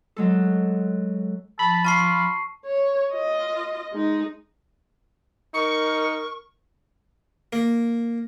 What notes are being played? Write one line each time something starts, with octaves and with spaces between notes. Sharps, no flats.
F#3 G#3 A4
F3 A5 B5
F4 A5 C#6 C7
C#5
F4 D#5
G#3 D#4
D#4 A#4 C#6 C#7
A#3